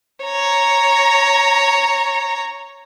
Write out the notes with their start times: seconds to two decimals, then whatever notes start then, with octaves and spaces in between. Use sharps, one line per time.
0.25 C#5 A#5